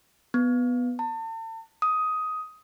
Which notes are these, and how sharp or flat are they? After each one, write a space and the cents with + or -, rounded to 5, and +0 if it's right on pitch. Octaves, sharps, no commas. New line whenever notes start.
B3 +0
A5 +40
D#6 +10